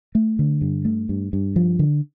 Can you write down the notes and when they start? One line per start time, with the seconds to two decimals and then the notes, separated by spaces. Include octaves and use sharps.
0.15 A3
0.39 D3
0.61 G2
0.85 A3
1.09 G2
1.33 G2
1.56 F3
1.79 D3